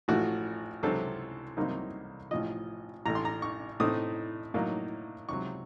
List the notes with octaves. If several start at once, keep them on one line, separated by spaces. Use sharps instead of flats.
A1 A2 F3 A3 F#4
C#2 C3 F#3 C4 A4
C2 C3 F#3 A#3 D#4
A1 A2 F3 D#5
A1 A2 A3 A#5
C6
A#5
C#6
A2 A3 C4 D#4 D#6
A2 F#3 A#3 D#4
C#2 C3 F#3 C#6